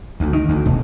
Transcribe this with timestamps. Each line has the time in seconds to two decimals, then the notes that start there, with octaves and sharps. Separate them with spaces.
0.20 D2
0.33 D#3
0.49 D2
0.66 E1